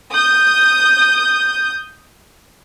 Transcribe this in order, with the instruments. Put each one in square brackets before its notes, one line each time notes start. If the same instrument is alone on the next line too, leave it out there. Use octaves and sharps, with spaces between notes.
[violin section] D#6 G6